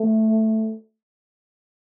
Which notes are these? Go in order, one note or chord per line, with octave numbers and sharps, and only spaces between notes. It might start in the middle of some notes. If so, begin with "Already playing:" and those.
Already playing: A3